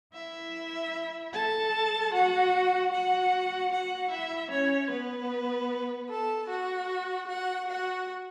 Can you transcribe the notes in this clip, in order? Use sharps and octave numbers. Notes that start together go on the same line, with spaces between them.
E4 E5
A4 A5
F#4 F#5
F#4 F#5
F#4 F#5
E4 E5
C#4 C#5
B3 B4
A4 A5
F#4 F#5
F#4 F#5
F#4 F#5